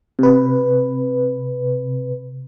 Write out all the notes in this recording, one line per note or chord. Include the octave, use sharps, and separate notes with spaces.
C3 B4